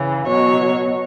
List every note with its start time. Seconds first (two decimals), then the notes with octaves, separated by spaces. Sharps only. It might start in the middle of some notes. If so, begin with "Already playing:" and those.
Already playing: C#3 E3
0.27 B2 F#3 C#5